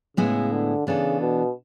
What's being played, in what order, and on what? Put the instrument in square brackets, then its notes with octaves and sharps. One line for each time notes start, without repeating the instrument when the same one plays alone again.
[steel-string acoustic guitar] A2 G#3 B3 E4 G#4 [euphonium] C#3
[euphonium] D3
[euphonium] C#3 [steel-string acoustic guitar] E3 B3 D4 A4
[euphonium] B2